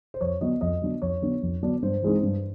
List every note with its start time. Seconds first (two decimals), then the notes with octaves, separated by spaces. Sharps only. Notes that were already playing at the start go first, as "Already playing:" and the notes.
0.14 C5
0.21 F2 C#5
0.41 D3 F#3 B3 D4 D#5
0.61 F2 D#5
0.82 D3 F#3 B3 D4
1.02 F2 C#5
1.22 D3 F#3 B3 D4
1.42 F2
1.63 D3 F#3 B3 D4
1.82 G2 C5
2.03 E3 G#3 C4 D#4
2.23 G2